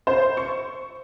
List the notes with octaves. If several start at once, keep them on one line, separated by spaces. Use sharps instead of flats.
C5
C#6